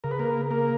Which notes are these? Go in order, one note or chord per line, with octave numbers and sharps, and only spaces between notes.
C#3 A#4
B4
A#3 A#4
A#3 A#4